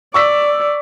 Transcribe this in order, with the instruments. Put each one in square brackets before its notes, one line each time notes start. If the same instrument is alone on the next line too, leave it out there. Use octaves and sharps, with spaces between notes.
[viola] D5 [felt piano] C#6 E6 B6